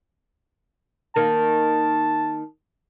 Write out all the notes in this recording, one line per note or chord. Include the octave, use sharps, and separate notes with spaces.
D#3 A#3 A5